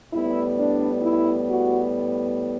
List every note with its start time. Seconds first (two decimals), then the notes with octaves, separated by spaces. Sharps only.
0.12 A2 G3 B3 E4
0.57 D4
1.03 E4
1.49 F#4